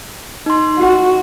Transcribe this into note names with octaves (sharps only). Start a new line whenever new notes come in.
D#4 C6
F#4